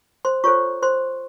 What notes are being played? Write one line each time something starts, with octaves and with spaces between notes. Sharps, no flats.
C5 C6
F4 A4 C5 C#5 C#6
C5 C6